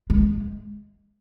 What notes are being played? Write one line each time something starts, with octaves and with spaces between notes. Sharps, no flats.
G#3